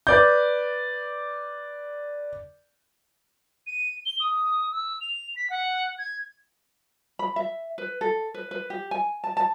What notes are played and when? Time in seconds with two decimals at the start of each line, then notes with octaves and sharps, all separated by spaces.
0.07 B4 D5 G6
3.67 D#7
4.06 G7
4.20 D#6
4.72 E6
5.01 F7
5.36 B6
5.50 F#5
5.98 G#6
7.19 B5
7.36 E5
7.78 B4
8.01 A4
8.34 B4
8.51 B4
8.70 G4
8.91 G#5
9.24 A5
9.37 A5